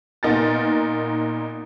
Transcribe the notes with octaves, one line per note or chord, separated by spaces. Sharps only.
A#2 B3 D#4 A#4 A6